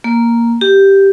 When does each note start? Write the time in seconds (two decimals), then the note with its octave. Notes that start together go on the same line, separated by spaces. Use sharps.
0.04 A#3
0.61 G4